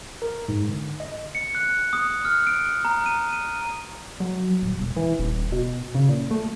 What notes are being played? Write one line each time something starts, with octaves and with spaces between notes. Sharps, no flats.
A#4
G#2
D3
D#5
C#7
F#6
D#6
F6
D7
A#5
D#7
D#7
F#3
D#1
E1
E3
D#1
B2
C#3
A#2
A3